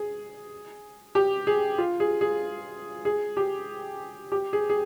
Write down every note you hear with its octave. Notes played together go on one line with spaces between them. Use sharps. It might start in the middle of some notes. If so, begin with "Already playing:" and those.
Already playing: G#4
G4
G#4
F4
G#4
G#4
G#4
G4
G4
G#4
G#4